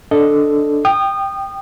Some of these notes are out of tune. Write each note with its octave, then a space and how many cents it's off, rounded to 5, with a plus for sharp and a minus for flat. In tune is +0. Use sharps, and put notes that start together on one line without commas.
D4 +0 A4 +0 D#5 +0
G5 +0 D#6 -30